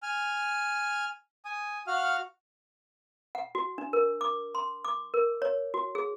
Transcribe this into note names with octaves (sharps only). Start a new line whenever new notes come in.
G#5 F6
G#5 D#6
F#4 F5 F#5 F6
F#5
F#4
D4
A#4
D6
C6
D6
A#4
C#5
F#4
G#4